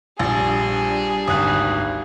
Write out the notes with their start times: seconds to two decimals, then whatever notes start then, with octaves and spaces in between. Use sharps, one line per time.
0.19 A#1 G3 D4 G#4
1.28 G#1 D2 D#6 F#6